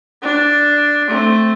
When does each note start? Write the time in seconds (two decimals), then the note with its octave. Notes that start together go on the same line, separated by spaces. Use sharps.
0.23 D4
1.08 A3 C4